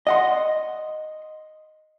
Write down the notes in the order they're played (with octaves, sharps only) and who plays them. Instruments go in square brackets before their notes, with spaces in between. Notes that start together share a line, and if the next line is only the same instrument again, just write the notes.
[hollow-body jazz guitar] D#5 F#5 C6